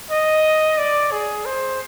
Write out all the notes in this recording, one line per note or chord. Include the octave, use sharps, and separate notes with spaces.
D#5
D5
G#4
C5